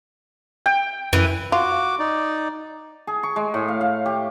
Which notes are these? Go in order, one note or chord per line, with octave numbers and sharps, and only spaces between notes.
G5
F#2 E3
F4 F#4 D6
D#4 D5
G#4
C#6
G#3
A2
F5
F5
G4